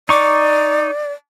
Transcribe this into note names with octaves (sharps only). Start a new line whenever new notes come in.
D#4 D5 C#6 D6